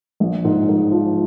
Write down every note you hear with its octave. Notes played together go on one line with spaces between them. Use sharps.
A#1
G#2
G#2
F3